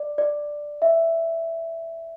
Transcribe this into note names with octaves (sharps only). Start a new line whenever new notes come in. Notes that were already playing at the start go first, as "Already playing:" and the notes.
Already playing: D5
D5
E5